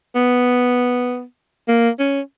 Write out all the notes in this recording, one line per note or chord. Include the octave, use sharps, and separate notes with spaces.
B3
A#3
C#4